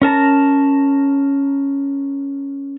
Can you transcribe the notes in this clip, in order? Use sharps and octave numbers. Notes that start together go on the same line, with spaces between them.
C#4 A#4 A5 A#5